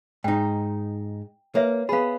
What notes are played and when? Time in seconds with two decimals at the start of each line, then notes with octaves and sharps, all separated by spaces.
0.24 G#2 D#4 G5
1.55 A#3 B4 C#5 E5
1.89 B3 G#4 F5 B5